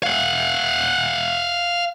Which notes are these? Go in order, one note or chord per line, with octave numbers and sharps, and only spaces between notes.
F5 F#5